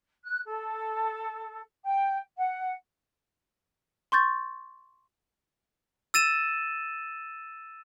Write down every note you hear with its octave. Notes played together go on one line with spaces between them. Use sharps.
F#6
A4
G5
F#5
C6 C#6 G6 A6
E6 A6 D#7 E7